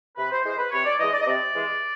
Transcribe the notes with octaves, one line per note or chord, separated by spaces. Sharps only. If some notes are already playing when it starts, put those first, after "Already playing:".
C3 B4
C5
E3 G#3 C5
B4
C3 C#5
D5
E3 G#3 D#5
D5
D#5
C3 D5
E3 G#3